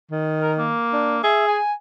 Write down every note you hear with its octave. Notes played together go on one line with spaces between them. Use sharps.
D#3
A#4
A#3
D4
G#4 E5
G#5